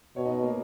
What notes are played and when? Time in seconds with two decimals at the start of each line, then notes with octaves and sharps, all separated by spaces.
0.16 B2 C#5
0.25 D#4
0.43 A#3